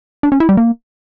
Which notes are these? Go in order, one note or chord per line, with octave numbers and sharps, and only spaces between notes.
D4
C#4
E4
G3
A#3